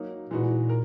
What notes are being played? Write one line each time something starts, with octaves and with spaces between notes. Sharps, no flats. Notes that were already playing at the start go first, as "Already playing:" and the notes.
Already playing: F#3 A#3 D#4
A#2 E3 G#3 D#4 F#4 B4
A#4